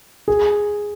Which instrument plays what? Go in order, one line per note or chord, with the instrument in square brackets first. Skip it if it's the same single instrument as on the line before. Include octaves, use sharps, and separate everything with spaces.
[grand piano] G#4